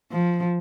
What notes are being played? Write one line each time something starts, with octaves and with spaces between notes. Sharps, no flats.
F3